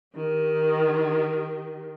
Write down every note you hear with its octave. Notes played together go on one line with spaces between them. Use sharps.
D#3 G4